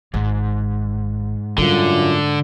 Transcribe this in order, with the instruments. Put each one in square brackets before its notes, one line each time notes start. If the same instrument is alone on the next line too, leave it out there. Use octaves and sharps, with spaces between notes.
[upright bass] G#1 [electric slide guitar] G#2
[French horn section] F#2 F4 [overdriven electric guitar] D3 [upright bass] G3